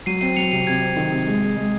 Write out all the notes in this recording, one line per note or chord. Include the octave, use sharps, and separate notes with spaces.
F#3 C7 D#7
C4 C7 D#7
F#3 C#7 F7
C3 C7 D#7
C3 G#6 C7
C4
D#3
C3
G#3
G#3
G#3